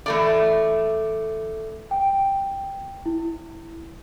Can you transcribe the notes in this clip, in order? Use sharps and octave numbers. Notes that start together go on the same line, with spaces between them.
E3 A3 D5
G5
E4